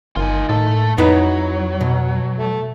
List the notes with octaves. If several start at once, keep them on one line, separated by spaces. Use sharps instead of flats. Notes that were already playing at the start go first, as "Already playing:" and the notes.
G1 D#3 F4 G#5
A2 A3 A4
F2 F#3 D#4 E4 B4 C#5
B2
A3